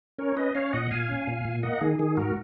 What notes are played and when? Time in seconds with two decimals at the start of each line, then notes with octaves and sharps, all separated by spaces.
0.19 C#4 A#4 C#5
0.36 C#4 B4 D#5
0.55 C#4 C#5 F5
0.73 A#2 D#5 F#5
0.91 A#2 F5 G#5
1.09 C#4
1.27 A#2
1.45 A#2
1.63 A#3 D#5 F#5
1.81 D#3 G#4
1.99 D#3 G#4
2.17 G#2 F#4 A#4